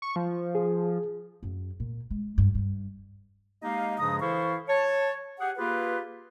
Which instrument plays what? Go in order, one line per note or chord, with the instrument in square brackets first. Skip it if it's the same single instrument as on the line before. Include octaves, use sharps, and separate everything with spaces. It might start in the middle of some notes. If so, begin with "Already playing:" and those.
[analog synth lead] C#6
F3
[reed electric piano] G#4
[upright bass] F#2
A#2
G#3
G2
G2
[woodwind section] G#3 A#3 D#4 G4 D#5 F5
G2 C#3 F3 G#3 A#5 D#6
E3 E4 A4 C5 F5 C#6
C#5 A5
G4 G#4 F#5
A#3 F4 G4 G#4 B4